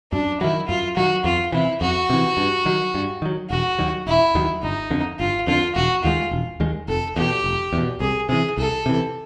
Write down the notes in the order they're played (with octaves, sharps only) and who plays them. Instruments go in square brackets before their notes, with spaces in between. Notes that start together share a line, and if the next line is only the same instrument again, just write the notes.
[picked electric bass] F#2 [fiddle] D4
[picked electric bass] D#3 F#3 [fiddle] E4
[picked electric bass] F#2 [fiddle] F4
[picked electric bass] D#3 F#3 [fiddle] F#4
[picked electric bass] F2 [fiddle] F4
[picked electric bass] C3 E3 [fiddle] E4
[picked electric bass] F2 [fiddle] F#4
[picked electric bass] C3 E3
G2
D#3 F#3
G2
D#3 F#3
[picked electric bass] E1 [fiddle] F#4
[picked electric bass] D#2 D#3 F#3
[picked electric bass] E1 [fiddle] E4
[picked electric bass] D#2 D#3 F#3
[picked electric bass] G1 [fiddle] D#4
[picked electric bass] F2 D3
[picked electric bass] G1 [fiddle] F4
[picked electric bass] F2 D3 [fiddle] F4
[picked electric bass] E1 [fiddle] F#4
[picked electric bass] D#2 D#3 G#3 [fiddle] F4
[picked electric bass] E1
D#2 D#3 G#3
[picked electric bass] F1 [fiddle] A4
[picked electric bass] E2 B2 [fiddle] G4
[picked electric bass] F1
E2
B2
[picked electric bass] C2 [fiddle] G#4
[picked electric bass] C3 E3 [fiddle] G#4
[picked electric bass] C2 [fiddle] A4
[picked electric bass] C3 E3